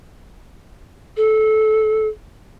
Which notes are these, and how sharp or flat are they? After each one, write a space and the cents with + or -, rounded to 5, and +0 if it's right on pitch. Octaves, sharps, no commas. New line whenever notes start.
A4 -20